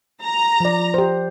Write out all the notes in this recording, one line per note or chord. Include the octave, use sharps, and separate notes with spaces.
A#5
F3 D5
G4 C5